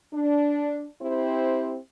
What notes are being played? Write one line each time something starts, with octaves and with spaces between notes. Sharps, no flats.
D4
C4 E4 G4 C5